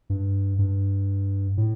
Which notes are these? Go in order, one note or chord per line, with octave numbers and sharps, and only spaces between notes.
G2
G2
A2